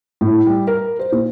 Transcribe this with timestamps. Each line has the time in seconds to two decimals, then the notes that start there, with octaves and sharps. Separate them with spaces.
0.21 A2
0.46 G3
0.67 A#4
0.99 C5
1.12 A#2